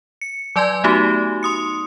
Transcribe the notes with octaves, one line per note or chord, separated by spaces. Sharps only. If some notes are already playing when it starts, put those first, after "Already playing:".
C#7
F#3 B4 D5 G#5 C6 G#6
A3 B3 D#4 F#4 G4
C6 D#6 C#7